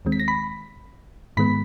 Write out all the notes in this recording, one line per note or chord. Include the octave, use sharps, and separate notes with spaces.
D#2 D#3 G#3 C4
B6
A#6
B5 B6
G#2 D#3 G#3 B3 B5 B6